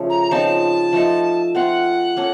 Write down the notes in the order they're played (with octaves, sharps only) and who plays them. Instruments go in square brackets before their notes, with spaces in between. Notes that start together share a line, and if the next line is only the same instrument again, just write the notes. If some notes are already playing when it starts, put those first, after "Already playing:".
Already playing: [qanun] C#3 F3 A3 C#4
[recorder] A#5
A#5
[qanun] C#3 F3 C4 D#4 [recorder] A5
[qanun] F3 A3 D#4 A4
[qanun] A3 C4 F4 [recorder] F#5
[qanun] A#3 C#4 A4